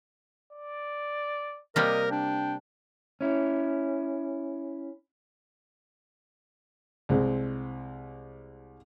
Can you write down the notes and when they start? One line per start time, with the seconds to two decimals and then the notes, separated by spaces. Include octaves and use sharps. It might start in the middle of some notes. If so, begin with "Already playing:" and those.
0.53 D5
1.76 C3 G3 A#3 A#4 D#5
2.11 D4 G5
3.21 C#4 E4
7.09 C2 G#3 C4